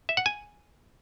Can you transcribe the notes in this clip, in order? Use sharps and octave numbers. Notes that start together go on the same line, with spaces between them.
E5
F#5
G#5